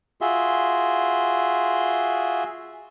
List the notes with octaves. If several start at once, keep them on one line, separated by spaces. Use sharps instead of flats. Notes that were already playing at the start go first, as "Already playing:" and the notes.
F4 F#4 G#4 E5 C6